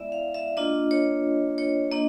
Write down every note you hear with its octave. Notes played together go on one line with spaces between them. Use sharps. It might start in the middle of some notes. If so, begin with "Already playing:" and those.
Already playing: G#3 B3 E4 D5 E5
F5
E5
A#3 D4 F4 D#5
C#5
C#5
A#3 D4 D#5